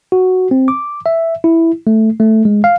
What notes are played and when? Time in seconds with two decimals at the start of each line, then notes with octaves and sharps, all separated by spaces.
0.12 F#4
0.51 C4
0.68 D6
1.06 E5
1.44 E4
1.87 A3
2.20 A3
2.45 G#3
2.64 F5